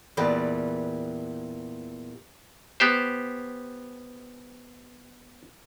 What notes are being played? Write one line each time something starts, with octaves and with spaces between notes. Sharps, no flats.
E2 A#2 G3 B4
B3 G4 C5